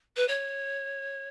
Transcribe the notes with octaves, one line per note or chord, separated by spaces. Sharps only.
B4
C#5